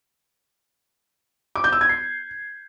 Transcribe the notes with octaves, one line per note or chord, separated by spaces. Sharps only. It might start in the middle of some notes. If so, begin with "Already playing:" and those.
D6
G6
E6
G#6
C7